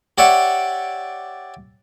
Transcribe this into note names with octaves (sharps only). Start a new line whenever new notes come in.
G4 C#5 D5 E5 F#5